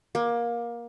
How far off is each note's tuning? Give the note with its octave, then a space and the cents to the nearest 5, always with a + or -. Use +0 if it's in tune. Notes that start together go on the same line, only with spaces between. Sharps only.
A#3 +20